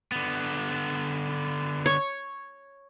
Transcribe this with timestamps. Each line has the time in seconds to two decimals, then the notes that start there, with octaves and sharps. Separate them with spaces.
0.12 D3 B3
1.86 C#5